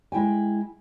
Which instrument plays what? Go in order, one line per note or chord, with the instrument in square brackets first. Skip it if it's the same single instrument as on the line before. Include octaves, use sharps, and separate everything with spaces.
[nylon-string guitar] G#3 E4 G5 G#5